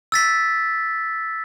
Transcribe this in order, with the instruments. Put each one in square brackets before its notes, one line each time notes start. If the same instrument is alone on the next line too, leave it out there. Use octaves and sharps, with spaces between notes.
[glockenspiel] E6 A6 B6